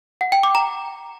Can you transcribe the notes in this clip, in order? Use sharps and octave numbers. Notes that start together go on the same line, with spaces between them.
F#5
G5
D6
A#5